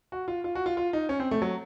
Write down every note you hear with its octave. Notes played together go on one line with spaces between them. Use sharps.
F#4
F4
F4
F#4
F4
F4
D#4
C#4
C4
A3
F#3